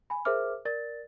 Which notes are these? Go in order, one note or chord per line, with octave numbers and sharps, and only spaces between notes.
G#5 B5
G#4 A#4 C5 E5 D6 F6
A#4 D5 A6